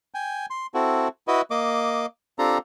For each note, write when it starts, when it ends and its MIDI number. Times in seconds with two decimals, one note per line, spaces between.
0.14 0.46 79
0.14 0.46 80
0.50 0.67 84
0.74 1.08 60
0.74 1.08 64
0.74 1.08 66
0.74 1.08 69
1.27 1.42 64
1.27 1.42 66
1.27 1.42 71
1.27 1.42 75
1.51 2.06 58
1.51 2.06 75
1.51 2.06 86
2.39 2.58 60
2.39 2.58 62
2.39 2.58 65
2.39 2.58 67
2.39 2.58 69
2.39 2.58 82